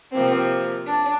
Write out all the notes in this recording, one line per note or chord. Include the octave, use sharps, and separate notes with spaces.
C3 F3 A#3 C4
D4